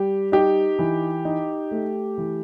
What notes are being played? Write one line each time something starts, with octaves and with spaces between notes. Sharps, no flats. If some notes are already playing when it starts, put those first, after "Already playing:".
Already playing: G3 G4
D#4 G4
E3
D#4
A3
E3